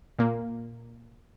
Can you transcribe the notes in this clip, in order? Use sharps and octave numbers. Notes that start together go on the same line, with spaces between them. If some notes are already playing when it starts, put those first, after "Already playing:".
A#2 A#3